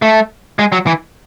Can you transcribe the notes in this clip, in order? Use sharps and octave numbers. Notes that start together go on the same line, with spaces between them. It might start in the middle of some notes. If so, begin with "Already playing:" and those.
A3
G#3
F#3
E3